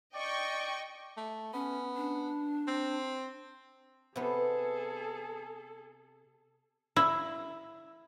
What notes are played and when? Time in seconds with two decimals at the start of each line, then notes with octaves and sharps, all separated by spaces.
0.15 D5 D#5 G5 C#6
1.17 A3
1.53 B3 C#4
1.96 D4
2.68 C4
4.16 C3 B3 G#4 A4
6.96 E4